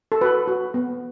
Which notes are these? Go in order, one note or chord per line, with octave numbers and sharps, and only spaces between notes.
A4
F#4 B4
F#4
B3